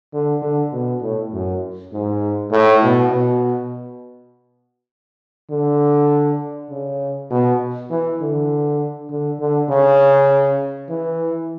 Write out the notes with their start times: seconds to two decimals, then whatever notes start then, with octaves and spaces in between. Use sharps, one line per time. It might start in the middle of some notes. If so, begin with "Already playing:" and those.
0.13 D3
0.42 D3
0.73 B2
1.02 A2
1.33 F#2
1.93 G#2
2.51 A2
2.82 B2
3.12 B2
5.50 D3
6.70 C#3
7.31 B2
7.90 E3
8.21 D3
9.10 D3
9.40 D3
9.70 C#3
10.89 E3